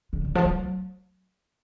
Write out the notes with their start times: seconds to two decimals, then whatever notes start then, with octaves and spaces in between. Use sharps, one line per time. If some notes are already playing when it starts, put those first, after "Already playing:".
0.13 D3
0.24 D3
0.35 F3
0.45 F#3